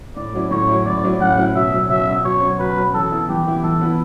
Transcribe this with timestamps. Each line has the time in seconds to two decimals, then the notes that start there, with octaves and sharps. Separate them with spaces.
0.17 A2 D5
0.33 F#3 C#4 E4
0.51 A2 C#5
0.68 F#3 C#4 E4
0.86 A2 D5
1.04 F#3 C#4 E4
1.21 A2 F#5
1.37 F#3 C#4 E4
1.55 B2 E5
1.73 F#3 C#4
1.90 B2 E5
2.07 F#3 C#4
2.24 B2 C#5
2.41 F#3 C#4
2.59 B2 B4
2.77 F#3 C#4
2.94 E3 A4
3.12 B3 E4
3.29 E3 G4
3.46 B3 E4
3.63 E3 A4
3.81 B3 E4